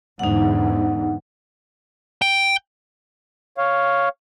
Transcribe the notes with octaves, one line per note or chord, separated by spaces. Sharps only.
E2 G#2 D3 D#4 F#5
G5
C#5 F5